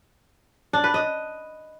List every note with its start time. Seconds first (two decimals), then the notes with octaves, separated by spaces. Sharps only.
0.73 D4
0.84 B4
0.94 D#5